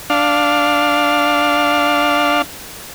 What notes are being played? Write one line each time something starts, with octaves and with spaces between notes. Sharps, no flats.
D4 F5